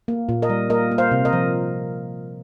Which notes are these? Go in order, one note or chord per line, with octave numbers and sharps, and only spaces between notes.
A#3
A#2
A#4 D#5
G3
A#3 A#4 D#5
A#3
C5 F5
C3
A#4 D#5
F3